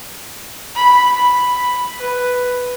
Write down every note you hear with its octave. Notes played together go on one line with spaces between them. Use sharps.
B5
B5
B4